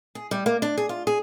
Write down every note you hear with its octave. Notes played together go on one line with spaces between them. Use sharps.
G#4
G3
A#3
D4
G#4
F4
G#4